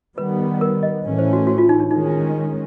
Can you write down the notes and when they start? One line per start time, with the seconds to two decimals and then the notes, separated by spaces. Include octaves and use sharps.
0.18 D#3 G3 B3 B4
0.61 A#4
0.83 D#5
1.05 A2 E3 A3 C#4
1.19 C5
1.33 F#4
1.47 F#4
1.58 F4
1.69 D#4
1.80 D4
1.91 D#3 G#3 C#4 D#4